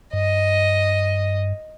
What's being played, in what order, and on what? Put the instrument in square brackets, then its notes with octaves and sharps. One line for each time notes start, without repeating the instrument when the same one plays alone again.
[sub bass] G2 [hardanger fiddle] D#5